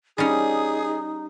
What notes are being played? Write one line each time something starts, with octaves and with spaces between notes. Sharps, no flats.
G3 C#4 D#4 G#4